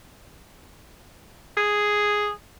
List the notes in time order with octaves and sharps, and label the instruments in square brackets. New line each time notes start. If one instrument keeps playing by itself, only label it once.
[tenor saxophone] G#4